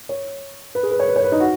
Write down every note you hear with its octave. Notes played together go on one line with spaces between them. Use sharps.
C#5
B4
G#4
B4
C#5
B4
C#5
B4
D#4
F#4